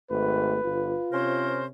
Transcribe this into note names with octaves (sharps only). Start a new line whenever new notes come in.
G#1 A3 B4
G1 F4
C3 C#4 A#4 C5